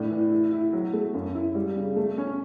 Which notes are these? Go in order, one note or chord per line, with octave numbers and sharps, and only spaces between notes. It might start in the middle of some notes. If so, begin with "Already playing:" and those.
Already playing: A2 D4
E3
E4
E4
F#3
A3
F#2
E4
G3
C#3
A3
C#4